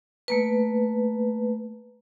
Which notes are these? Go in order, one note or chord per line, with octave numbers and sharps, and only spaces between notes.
A3 A#3 B4